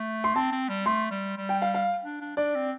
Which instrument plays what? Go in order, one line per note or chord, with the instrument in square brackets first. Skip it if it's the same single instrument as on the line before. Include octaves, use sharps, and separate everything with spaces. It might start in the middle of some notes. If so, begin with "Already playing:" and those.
Already playing: [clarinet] A3
[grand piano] C6
[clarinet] C4 [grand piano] A5
[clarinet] C4
G3
[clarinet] A3 [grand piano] C6
[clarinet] G3
G3
[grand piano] G5
F5
F5
[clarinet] D4
D4
[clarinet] D4 [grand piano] D5
[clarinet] C4